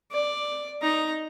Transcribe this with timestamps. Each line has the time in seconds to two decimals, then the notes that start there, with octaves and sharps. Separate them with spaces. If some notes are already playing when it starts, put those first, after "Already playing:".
0.11 D5
0.82 D#4 A#5